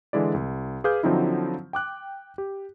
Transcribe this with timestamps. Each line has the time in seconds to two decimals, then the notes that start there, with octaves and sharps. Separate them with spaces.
0.13 D3 E3 G#3 E4 D5
0.34 C2
0.84 G#4 B4 F5 D6 F6 G6
1.03 D3 F3 F#3 C4 D#4 E4
1.73 G5 D6 F#6
2.38 G4